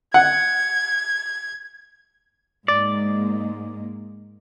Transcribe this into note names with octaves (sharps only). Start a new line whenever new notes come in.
F#5 G#6
G#2 G#3 A#3 D5